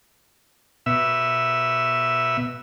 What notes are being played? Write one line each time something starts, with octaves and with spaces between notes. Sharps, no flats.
B2 E5